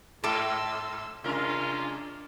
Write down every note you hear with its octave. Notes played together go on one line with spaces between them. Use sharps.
G#2 A4 C6 D6 E6
C3 G#3 C#4 D4 F4 A#4